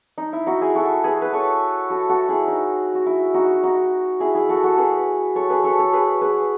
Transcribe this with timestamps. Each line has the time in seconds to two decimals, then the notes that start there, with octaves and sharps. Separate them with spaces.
0.18 D#4
0.33 E4
0.47 D#4 F#4
0.61 E4 G#4
0.75 F#4 A4
1.04 G#4 B4
1.22 B4
1.33 A4 C#5
1.90 F#4 A4
2.09 F#4 A4
2.29 E4 G#4
2.48 D#4
2.94 F#4
3.06 E4
3.34 D#4 F#4
3.63 D#4 F#4
4.20 E4 G#4
4.34 E4 G#4
4.49 F#4 A4
4.64 F#4 A4
4.78 G#4 B4
5.35 A4 C#5
5.49 G#4 B4
5.64 A4 C#5
5.79 A4 C#5
5.93 G#4 B4
6.21 G#4 B4